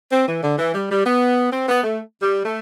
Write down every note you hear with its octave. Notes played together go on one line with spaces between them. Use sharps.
C4
E3
D3
E3
G3
G3
B3
C4
B3
A3
G3
A3